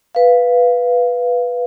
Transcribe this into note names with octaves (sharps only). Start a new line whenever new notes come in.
B4 F5